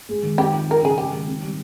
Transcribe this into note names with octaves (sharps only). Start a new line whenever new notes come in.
G#3
D#3
C4 G4
F3
F3 A#4
C#3 G#4
G#3 G4
D#3
C4
G3